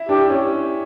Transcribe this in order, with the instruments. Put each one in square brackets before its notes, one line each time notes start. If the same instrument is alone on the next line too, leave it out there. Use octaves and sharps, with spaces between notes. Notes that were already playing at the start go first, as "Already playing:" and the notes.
Already playing: [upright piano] E4
[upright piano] D4 [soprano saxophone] G4
[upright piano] C#4